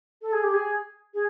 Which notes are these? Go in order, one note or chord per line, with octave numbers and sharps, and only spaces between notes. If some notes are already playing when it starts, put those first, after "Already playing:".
A4
G#4
G4
G#4
G#4